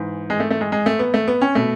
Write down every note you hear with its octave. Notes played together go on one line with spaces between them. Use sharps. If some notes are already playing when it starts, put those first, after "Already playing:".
Already playing: G#2 E3
G#3
A3
A3
G#3
G#3
A3
B3
A3
B3
C#4
B2 A3